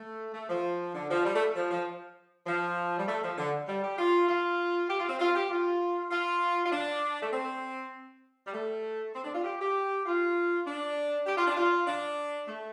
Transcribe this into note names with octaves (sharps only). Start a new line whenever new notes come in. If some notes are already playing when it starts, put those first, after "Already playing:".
Already playing: A3
A3
F3
D3
F3
G3
A3
F3
F3
F3
G3
A3
F3
D3
G3
G4
F4
F4
G4
F4
C4
F4
G4
F4
F4
F4
D4
A3
C4
G3
A3
C4
D4
F4
G4
G4
F4
D4
G4
F4
D4
F4
D4
A3